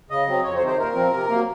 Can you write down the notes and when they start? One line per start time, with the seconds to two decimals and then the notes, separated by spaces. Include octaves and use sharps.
0.10 C#3 D#5
0.27 F#3 C4
0.44 F2 C#5
0.55 C5
0.61 C3 D#3
0.67 C5
0.78 A#2 A#4
0.95 F3 C4
1.12 C3
1.29 F#3 A#3